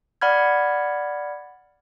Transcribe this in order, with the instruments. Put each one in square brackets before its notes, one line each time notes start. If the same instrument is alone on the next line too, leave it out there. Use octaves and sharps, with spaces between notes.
[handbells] D5 F#5 B5 F6 G#6